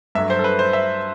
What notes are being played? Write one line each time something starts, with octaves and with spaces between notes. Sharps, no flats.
G2 F#3 A3 E5
C5
A4
B4
C5
E5